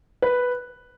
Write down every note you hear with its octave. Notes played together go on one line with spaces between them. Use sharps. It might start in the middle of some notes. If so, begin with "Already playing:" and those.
B4